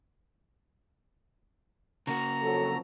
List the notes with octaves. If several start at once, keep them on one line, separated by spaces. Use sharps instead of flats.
C#3 A#3 F#4 A#5
F2 F#3 A4